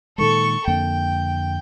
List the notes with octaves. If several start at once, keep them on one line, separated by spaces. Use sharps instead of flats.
A#2 D#3 G#3 A4 C#6
F2 D3 A#3 G5